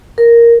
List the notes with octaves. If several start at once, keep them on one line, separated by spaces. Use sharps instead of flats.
A#4